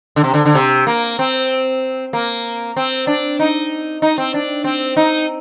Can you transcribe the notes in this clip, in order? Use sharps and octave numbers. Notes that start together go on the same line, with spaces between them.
D3
C3
D3
D3
C3
A#3
C4
A#3
C4
D4
D#4
D#4
C4
D4
C4
D#4